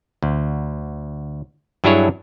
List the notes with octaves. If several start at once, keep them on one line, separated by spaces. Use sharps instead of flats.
D2
G2 F#3 D4 E4 G#4 C#5